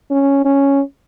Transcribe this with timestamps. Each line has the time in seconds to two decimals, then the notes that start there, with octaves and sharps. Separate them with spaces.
0.11 C#4
0.45 C#4